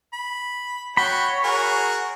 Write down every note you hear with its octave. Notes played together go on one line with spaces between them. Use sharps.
B5
F#4 C#5 G5 B5
F#4 G#4 A#4